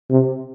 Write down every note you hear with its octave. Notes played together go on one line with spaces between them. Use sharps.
C3